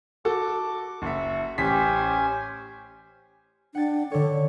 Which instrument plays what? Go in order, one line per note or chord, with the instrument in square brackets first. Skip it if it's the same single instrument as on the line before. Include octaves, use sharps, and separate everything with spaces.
[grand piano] F#4 A4 [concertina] D6
[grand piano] F#1 E5 [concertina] F#4
[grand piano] A1 B6 [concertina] C#4 C5 G#5 [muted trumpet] G4
[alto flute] D4 [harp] F#5 G5 A6
[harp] D3 C#5 [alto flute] A4